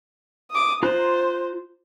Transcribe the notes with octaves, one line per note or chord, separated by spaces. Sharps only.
D6 D#6
F4 C5 A#5 F#6